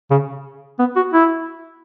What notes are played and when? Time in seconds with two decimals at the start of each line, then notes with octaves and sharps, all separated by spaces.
0.11 C#3
0.79 B3
0.96 F#4
1.14 E4